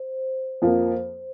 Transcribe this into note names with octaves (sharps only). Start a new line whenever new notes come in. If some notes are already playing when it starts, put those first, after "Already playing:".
Already playing: C5
F2 F3 A#3